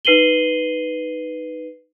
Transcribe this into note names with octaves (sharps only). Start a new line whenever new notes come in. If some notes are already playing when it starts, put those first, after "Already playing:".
D#4 B4 C7 D#7 F#7 G7